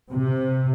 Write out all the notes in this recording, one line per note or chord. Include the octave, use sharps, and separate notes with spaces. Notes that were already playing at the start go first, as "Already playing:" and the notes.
C3